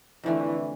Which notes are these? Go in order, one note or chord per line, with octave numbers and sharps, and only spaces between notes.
F2 D3 E3 A3 D4